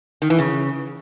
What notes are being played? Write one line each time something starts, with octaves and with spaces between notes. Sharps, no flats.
D#3
E3
C#3